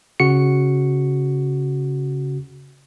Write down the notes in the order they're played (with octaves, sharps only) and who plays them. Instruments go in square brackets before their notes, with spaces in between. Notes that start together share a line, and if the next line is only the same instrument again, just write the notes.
[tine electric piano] C#3 F#4 C#7